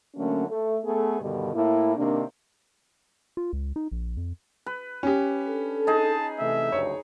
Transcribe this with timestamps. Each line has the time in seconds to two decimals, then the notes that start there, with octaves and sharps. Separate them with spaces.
0.16 D3 F#3 A3 A#3 C#4
0.48 A3
0.84 A3 B3 G#4 A4
1.21 G2 B2 D3 D#3 G3
1.54 A2 A#3 E4
1.96 C3 D#3 A#3 D4
3.37 F4
3.53 C#2
3.76 D#4
3.92 A#1
4.17 F2
4.66 B4
5.03 C#4 G4
5.47 D4 A4
5.87 D#4 G#4 A5
6.40 C3 E3 A3 E5
6.72 F#1 D2 G2 C#5